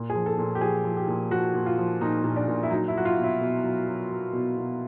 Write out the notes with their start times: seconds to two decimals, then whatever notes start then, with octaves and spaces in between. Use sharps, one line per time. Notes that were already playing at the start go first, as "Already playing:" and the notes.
Already playing: A#2
0.10 G#4
0.15 F3
0.26 A4
0.38 A#2
0.55 G4
0.61 F3 G#4
0.84 F3
0.97 G4
1.08 A#2
1.31 F3 F#4
1.54 A#2
1.66 F4
1.78 F3
2.01 A#2 D#4
2.24 A#2
2.36 D4
2.48 A#2
2.63 E4
2.70 F#3 D#4
2.88 E4
2.94 F#3 F#4
3.05 F4
3.17 B2
3.24 E4
3.41 B2
3.64 F#3
3.87 F#3
4.10 F#3
4.33 B2
4.57 B2